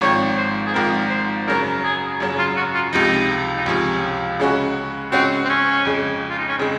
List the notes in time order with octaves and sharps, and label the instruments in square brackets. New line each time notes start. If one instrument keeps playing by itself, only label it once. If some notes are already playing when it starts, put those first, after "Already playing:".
[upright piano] G#1 G#2 F3 C4 [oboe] C#5
[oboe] C5
G#4
[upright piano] G#1 G#2 F3 C4 [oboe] A#4
[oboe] C5
[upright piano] F#2 C#3 F#3 [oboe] A#4
[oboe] G#4
[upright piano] F#2 C#3 F#3
[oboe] F4
F#4
F4
[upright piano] C#2 C3 F3 [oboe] D#4
[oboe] D#4
[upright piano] C#2 C3 F3 [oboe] C#4
[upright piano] C#3 G#3 C#4 F#4
[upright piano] C#3 G#3 C#4 F#4 [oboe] C4
[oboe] C4
C#4
[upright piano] F2 C#3 G#3
[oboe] F4
D#4
C#4
[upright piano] C#3 G#3 [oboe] C4